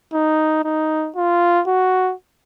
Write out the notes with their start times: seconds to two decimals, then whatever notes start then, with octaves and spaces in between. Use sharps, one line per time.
0.13 D#4
0.64 D#4
1.16 F4
1.67 F#4